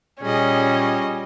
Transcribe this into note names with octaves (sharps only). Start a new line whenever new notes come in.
A#2 G3 C#4 G#4 D#5